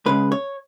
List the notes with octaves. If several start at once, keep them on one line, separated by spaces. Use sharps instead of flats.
C#2 C#3 G#3 B4
C#5